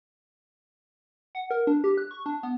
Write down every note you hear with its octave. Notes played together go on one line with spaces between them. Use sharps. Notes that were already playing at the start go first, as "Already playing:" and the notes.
F#5
A#4
D4
G4
F#6
C#6
D4
B3